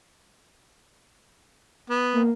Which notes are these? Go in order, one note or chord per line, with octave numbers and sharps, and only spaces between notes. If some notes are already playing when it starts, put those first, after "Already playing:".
B3
A#3